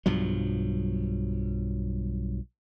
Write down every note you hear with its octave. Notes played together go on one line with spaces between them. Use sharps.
B1 G2 F3 F#3